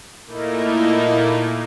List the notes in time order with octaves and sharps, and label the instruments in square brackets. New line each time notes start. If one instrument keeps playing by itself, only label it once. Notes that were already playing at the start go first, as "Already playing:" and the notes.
[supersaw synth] A#2 A3 A#3 D#4 E4